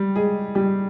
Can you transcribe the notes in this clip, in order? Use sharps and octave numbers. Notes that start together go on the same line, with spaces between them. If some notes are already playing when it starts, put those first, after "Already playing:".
Already playing: G3 G4
G#3 G#4
G3 G4